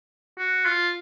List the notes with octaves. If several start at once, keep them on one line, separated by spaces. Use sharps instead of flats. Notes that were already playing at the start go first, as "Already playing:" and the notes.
F#4
F4